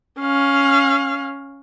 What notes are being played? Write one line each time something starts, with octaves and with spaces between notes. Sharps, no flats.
C#4 F5